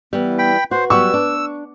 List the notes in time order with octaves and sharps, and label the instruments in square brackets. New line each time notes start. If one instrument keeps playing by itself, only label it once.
[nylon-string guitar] E3 G3 [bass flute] B3
[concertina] G5 B5
[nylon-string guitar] F#4 [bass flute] B4 [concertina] C5
[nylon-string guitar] F#3 G3 B3 [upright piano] C#6 [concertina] E6
[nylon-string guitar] D4